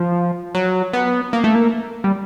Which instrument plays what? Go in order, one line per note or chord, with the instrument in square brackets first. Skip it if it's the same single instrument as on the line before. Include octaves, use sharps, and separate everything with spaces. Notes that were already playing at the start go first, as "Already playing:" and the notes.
Already playing: [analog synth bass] F3
F#3
B3
A#3
A3
A#3
G3